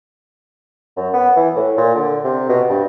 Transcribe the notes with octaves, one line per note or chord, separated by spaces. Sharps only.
F#2
B3
E3
A2
A#2
D3
C3
B2
G2